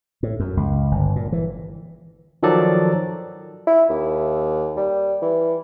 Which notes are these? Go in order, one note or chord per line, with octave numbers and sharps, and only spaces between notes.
A2
F#2
C#2
G1
A#2
E3
D#3 F3 F#3 A4 D5
E4
D#2
G3
E3